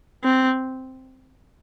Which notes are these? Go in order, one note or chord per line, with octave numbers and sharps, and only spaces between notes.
C4